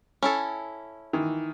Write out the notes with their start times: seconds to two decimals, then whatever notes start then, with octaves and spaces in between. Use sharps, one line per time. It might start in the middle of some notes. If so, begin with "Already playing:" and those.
0.23 C#4 E4 A4
1.13 D#3 E3